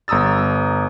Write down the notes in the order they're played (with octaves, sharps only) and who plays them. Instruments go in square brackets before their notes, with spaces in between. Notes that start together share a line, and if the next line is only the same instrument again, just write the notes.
[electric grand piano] G1 A#5 D#6 E6 A6